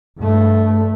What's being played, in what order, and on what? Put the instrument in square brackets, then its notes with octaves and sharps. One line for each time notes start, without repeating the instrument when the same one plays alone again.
[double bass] G2 A3